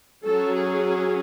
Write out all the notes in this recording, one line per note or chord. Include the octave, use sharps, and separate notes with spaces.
F#3 C#4 A4
G#4